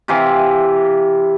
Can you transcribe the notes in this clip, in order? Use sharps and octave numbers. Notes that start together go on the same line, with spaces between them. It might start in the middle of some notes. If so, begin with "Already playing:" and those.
C3 E3 F5